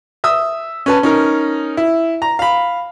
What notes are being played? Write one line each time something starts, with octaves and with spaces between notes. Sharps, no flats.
E5 D#6 E6
C#4 B4 A5
C#4 D#4 A#4
E4
A#5
F5 B5